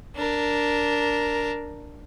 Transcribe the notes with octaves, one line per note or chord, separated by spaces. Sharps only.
D4 A#4